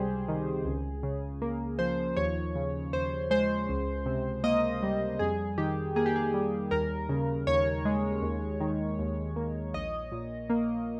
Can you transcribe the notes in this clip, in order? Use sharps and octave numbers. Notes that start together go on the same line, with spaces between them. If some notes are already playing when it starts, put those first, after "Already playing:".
Already playing: C#2 C3 G3 G4 G#4 C5
D#3
C#2
C#3
A#3
F3 C5
D#2 C#5
C#3
D#2 C5
G#3 C5
C#2
C3
A#3 D#5
G3
F2 G#4
D#3 G4
A#3 G#4
G4
G#4
G3
D#2 A#4
C#3
D#2 C#5
G#3
D#2
D#3
D#2
A#3
A#1 D#5
A#2
A#3